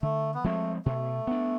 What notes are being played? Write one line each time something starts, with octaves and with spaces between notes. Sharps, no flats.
D3 A3
B3
F3 G#3 A3 C4
B2 A3
B3 D4